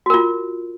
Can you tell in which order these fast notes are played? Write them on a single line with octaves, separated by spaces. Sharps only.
F#4 A#4 F4